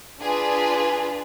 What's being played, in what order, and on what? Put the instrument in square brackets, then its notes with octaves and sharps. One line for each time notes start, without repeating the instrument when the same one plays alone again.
[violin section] D4 F4 G#4 B4